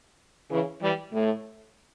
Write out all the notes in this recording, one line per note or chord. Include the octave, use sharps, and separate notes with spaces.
C#3 E3
E3 G3
A2